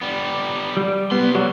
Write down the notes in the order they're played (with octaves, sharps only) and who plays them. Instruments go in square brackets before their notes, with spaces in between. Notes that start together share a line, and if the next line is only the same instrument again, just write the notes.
[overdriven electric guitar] G3 B3
[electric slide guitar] G3
[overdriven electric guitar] C2 C6 [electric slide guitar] B3
[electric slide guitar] F#3 G3 F#4